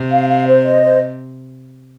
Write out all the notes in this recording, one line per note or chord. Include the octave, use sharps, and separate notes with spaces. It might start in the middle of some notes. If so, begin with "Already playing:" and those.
Already playing: C3
F5
F5
C5
D#5
C5